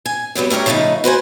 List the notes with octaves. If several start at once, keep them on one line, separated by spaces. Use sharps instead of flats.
G#5
C3 F#3 G3 B3
A3 C#4 G4 A#4 C#5
C#3 F3 A3 B3 D#4
F#4 B4 C5 G#5